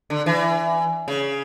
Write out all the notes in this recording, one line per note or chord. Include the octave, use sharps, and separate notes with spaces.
D3
E3
C#3